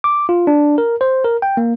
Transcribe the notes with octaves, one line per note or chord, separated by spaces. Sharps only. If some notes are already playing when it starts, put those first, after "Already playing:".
D6
F4
D4
A#4
C5
A#4
G5
A#3